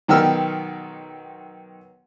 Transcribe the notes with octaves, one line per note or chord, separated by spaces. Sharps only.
B1 D#3 B3 G4 E6 F6